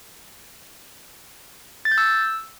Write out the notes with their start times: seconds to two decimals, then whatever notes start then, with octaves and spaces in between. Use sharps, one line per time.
1.85 A6
1.91 G6
1.98 E6